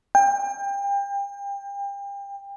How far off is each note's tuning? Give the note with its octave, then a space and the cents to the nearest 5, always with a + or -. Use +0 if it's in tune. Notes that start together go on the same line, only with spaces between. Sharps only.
G5 +30